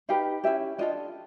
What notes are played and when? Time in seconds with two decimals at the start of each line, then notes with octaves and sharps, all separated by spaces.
0.09 D#4 G4 B4 F5
0.44 C#4 E4 G4 E5
0.78 D4 F4 A4 D#5